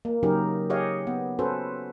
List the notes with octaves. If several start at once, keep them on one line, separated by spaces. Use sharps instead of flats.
A#3
C#3 F#3 C#4 D#4 G4 A#4
G4 G#4 C#5 D#5 F5
B3
C#4 F#4 A4 B4 C5